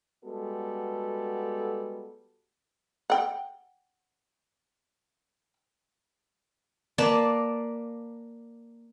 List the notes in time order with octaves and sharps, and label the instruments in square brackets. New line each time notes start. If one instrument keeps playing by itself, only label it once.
[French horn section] G3 G#3 B3 F#4 A4 B4
[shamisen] F#5 G5
[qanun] A#3 B4 D5 A5